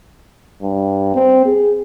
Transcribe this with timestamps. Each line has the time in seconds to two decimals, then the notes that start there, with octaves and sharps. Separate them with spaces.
0.62 G2
1.15 C4
1.45 G#4